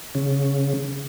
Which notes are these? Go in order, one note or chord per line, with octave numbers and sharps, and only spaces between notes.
C#3